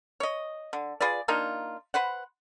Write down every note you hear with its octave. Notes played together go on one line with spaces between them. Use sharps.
C#5 D#5
D3
F4 G#4 B4 D5
A#3 D4 D#4 F4
B4 C5 F#5